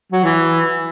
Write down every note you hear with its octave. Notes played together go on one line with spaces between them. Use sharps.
F#3
E3